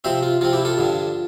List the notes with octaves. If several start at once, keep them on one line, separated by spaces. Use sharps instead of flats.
C3 F3 C4 C5 E5
F4
C3 F3 C4 F4
E4 G4
F4 A4
G2 D3 F3